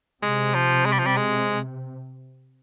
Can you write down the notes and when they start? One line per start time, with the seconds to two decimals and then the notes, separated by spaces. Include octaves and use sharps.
0.22 C3 G#3
0.54 F3
0.85 G#3
0.92 G3
0.99 F3
1.06 G3
1.16 G#3